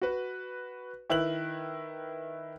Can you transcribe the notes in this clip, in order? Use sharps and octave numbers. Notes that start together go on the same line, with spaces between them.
F#4 B4
D#3 E4 B4 F#6 F#7